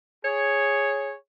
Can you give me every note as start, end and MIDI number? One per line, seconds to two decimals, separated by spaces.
0.24 1.14 68
0.24 1.14 73